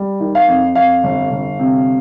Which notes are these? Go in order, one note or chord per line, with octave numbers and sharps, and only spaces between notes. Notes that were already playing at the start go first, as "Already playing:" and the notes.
Already playing: G3
D#3
F5
F2
F2 F5
G1
G1
C3